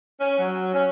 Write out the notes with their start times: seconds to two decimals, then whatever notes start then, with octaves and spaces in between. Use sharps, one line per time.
0.19 C#4
0.38 F#3
0.73 C#4